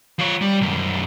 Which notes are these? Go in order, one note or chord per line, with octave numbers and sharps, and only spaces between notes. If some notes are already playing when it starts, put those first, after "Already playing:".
F3 C#5
G3
B1 F#2